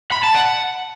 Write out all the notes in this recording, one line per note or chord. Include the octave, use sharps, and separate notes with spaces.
B5
A5
F#5